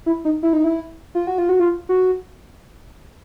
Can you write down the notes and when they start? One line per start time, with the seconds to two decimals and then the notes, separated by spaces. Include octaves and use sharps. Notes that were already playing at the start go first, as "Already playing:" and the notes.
0.06 E4
0.25 D#4
0.43 E4
0.53 D#4
0.64 E4
1.15 F4
1.27 F#4
1.38 F4
1.49 F#4
1.60 F4
1.89 F#4